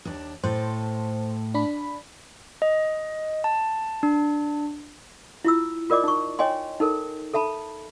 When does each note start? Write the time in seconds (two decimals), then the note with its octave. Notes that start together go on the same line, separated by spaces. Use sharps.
0.05 D#2 D4
0.44 A2 A4 C5
1.54 D4 B5
2.62 D#5
3.44 A5
4.03 D4
5.45 E4 F4 E6
5.90 F4 A#4 D5 D#5 D6
6.04 D#4 C#6
6.39 C#5 D#5 G5 G#5 C6
6.80 D#4 A4 A#4
7.34 A4 E5 A5 B5